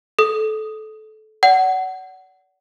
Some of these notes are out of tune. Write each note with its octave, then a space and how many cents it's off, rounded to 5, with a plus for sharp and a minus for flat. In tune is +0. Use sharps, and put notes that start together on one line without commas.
A4 -25 D#6 +0
D5 -35 F#5 +20